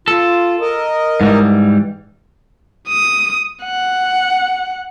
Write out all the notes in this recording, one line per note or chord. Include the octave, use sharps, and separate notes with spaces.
F4 A4
A#4 D#5
G#2 E3 G3
D#6
F#5